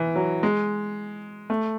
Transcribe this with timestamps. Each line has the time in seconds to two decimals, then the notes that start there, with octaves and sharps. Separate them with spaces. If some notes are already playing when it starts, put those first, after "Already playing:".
Already playing: E3
0.16 F#3
0.43 G#3
1.50 A3